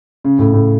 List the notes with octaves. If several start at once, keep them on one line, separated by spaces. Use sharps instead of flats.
C#3
A2
A2